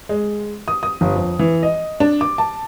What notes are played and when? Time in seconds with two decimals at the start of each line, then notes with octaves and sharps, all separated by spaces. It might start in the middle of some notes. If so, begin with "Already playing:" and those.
0.09 G#3
0.68 D#6
0.83 D#6
1.01 G1
1.16 F2
1.39 E3
1.63 D#5
2.00 D4
2.21 D6
2.38 A5